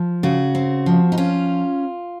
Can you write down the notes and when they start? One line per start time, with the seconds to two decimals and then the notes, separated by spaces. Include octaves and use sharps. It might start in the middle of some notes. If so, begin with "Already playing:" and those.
Already playing: F3
0.23 C#3 F#4
0.55 C4
0.86 F3
1.12 D#4
1.18 C#4 F4